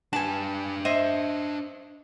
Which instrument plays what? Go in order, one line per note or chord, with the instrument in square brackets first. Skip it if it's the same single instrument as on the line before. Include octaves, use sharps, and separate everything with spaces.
[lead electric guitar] D4 B4 [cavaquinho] G#5 A5
[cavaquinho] C5 D#5 E5